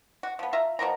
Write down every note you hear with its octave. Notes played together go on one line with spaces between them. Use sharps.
F#4
F3 B3
F4 E5 F5 A#5
B2 F3 A#4 A#5